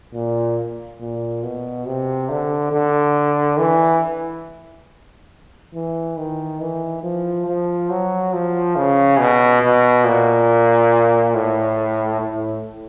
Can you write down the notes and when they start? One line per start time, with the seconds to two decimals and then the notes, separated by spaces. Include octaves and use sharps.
0.14 A#2
1.00 A#2
1.43 B2
1.86 C3
2.30 D3
2.72 D3
3.59 E3
5.74 E3
6.17 D#3
6.60 E3
7.03 F3
7.47 F3
7.90 F#3
8.33 F3
8.76 C#3
9.19 B2
9.62 B2
10.05 A#2
11.35 A2
12.21 A2